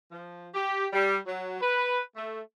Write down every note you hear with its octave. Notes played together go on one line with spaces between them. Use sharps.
F3
G4
G3
F#3
B4
A3